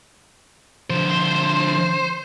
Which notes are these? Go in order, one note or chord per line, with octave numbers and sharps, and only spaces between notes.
D3 F3 C5